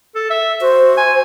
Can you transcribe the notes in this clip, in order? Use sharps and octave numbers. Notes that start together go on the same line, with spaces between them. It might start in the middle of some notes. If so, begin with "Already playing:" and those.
A4
E5
F#4 C5
G#5